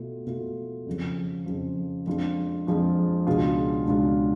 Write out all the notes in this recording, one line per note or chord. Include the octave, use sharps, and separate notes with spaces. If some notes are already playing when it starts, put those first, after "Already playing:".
Already playing: B2 A3 F4
B2 A3 F4
F2 C#3 F3
F2 C#3 F3
F2 F3 G#3 D4 F4
F2 F3 G#3 D4 F4
C#2 B2 G#3 D4 F4
C#2 B2 G#3 D4 F4